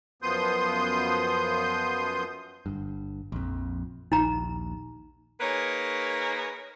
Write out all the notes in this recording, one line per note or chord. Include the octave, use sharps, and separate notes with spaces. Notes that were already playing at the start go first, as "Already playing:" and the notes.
F#2 F3 B3 C6 D#6 G6
G1 G2
A#1 F2
A#1 D#2 D#4 A#5
A#3 D#4 G#4 A#4 B4 C#5